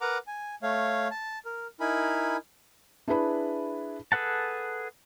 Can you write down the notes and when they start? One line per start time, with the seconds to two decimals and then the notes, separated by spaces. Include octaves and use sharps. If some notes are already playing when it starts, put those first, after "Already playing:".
0.01 A#4 B4 F#5 A#5 D6
0.27 G#5
0.63 A3 C#5 F5
1.11 A5
1.45 A#4
1.80 D#4 E4 A#4 G#5 B5
3.08 D4 E4 G#4 B4 B5
4.12 G#4 A4 B4 F#5 A5